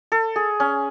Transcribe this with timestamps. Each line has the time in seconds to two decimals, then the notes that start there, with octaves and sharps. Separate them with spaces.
0.12 A4
0.36 G#4
0.60 C#4